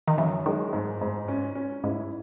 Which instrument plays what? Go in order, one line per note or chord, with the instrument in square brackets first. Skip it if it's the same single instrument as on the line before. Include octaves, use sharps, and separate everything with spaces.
[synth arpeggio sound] D#3
[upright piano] F#2 [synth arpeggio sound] E3
[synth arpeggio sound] D#3 [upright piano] G#3
[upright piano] G#2
G#2
C#4
C#4
[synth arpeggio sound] G#2 [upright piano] E4